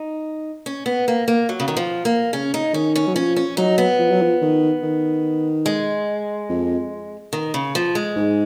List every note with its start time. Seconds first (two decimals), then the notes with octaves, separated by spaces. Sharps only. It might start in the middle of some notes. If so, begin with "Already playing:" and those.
Already playing: D#4
0.66 C#4
0.86 B3
1.08 A#3
1.28 A#3
1.49 F#3
1.60 C#3
1.68 D#3
1.77 F3
2.05 A#3
2.33 C#3 C#4
2.54 D#4
2.74 D#3 C#4
2.96 C#4
3.07 F#3
3.16 F3 C#4
3.36 C#4
3.57 F#3 D#4
3.78 B3
3.99 F3
4.11 F#3
4.22 F3
4.42 D#3
4.83 D#3
5.66 G#3
6.49 F2
7.33 D#3
7.54 C#3
7.75 F3
7.95 G#3
8.16 G#2